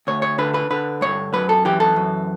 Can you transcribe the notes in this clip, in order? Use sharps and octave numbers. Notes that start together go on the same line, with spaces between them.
D2 C#5
C#5
D3 B4
B4
D3 B4
G2 C#5
F#2 B4
A4
E3 G4
A4
F#2